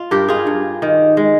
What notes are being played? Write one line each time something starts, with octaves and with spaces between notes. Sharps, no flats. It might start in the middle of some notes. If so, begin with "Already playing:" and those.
Already playing: F4
G2 G4 A#4
F4 G#4
G2
D#3
G#3